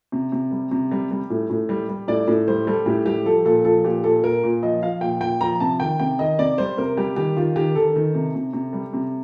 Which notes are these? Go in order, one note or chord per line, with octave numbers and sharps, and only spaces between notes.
C3
C3
G3
C3
G3
G3
A2
A2
G3
G3
A2 D5
A2
G3 C5
G3 A4
A2 G4
G3 G4
F3 A4
A#2 A4
F3 A4
A#2 G4
A#2 A4
A#2 A#4
A#2
F3 D#5
F3 F5
A#2 G5
A#2 G5
F3 A#5
C3 A5
D#3 G5
C3 G5
D#3 D#5
C3 D5
G3 C5
C3 A#4
G3 G4
D#3 G4
D#3 F4
D#3 G4
D#3 A4
D#3
C3
C3
C3
G3
C3